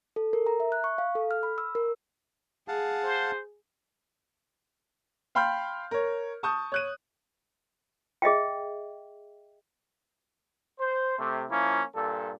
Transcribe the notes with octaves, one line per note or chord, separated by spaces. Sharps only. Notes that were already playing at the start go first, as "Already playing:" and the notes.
A4
A#4
A#5
E5
F#6
C#6
F5
A4
F6
B5
E6
A#4
G#4 F5 F#5 A5
C5
F5 G5 B5 C6 F6 G6
A#4 C#5
A5 C#6 D#6 G6
C#5 F#6 D#7
G#4 D#5 E5 G5
C5
C3 A3
F3 A#3 C#4 E4
G2 A#2 A4